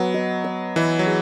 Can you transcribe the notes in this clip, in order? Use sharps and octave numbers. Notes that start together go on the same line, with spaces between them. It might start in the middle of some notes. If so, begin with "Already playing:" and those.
Already playing: F#3 B3
D#5
D#5
E3 D#5
F#3
G#4